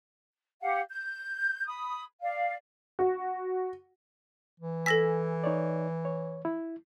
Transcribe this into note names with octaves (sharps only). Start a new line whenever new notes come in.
G4 F5 F#5
G6
B5 D#6
D5 F5
F#4
E3
A4 G#5 E6 A#6 B6
D#4 C#5 D5
C#5
E4